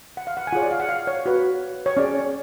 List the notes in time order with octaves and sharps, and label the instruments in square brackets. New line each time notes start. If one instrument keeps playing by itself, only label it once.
[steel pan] F#5
F5
F#5
G#5
F4 G#4 C#5 F#5
D5
F5
F#5
F5
C#5
F#4 B4
C#5
C#4 G#4 C#5 D5